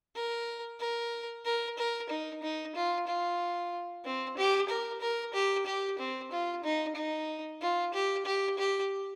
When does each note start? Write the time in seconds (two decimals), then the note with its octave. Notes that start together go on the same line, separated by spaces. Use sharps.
0.16 A#4
0.80 A#4
1.45 A#4
1.78 A#4
2.10 D#4
2.43 D#4
2.76 F4
3.07 F4
4.05 C4
4.38 G4
4.69 A#4
5.01 A#4
5.34 G4
5.66 G4
5.99 C4
6.32 F4
6.64 D#4
6.96 D#4
7.62 F4
7.94 G4
8.26 G4
8.58 G4